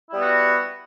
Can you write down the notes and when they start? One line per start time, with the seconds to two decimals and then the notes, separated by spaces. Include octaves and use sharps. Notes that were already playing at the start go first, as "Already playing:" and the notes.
0.10 E4
0.13 G3
0.16 B3
0.19 F#4